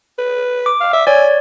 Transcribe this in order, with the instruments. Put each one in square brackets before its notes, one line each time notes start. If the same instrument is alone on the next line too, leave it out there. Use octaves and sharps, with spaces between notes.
[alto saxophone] B4
[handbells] D6
[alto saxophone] F5
E5
[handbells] C#5 D5 [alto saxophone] G#5